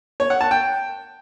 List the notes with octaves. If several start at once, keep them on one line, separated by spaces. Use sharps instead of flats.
C#5
F#5
A5
G5